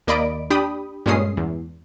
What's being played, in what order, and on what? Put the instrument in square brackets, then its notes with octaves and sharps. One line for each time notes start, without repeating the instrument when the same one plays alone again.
[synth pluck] D#2 A#3 D5 D#5 B5 D7
D4 G4 G5 B5 D#6
G2 A#2 G#3 C#4 D#6 C7
E2